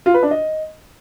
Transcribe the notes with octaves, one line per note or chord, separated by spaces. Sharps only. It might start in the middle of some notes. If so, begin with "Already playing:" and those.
F4
B4
D4
D#5